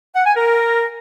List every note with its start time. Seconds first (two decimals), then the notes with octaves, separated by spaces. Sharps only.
0.15 F#5
0.26 G#5
0.36 A#4